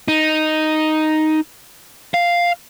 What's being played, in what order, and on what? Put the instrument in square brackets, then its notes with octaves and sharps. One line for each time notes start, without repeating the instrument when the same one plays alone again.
[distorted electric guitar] D#4
F5